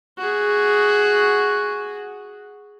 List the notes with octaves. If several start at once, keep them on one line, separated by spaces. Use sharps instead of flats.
F#4 G#4